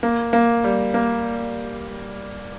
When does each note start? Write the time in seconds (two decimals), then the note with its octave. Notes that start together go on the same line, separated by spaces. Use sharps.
0.03 A#3
0.33 A#3
0.64 G3
0.94 A#3